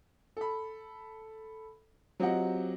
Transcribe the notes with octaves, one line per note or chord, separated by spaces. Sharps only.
A4 B5
F#3 C4 F4 G4 D#5 F#5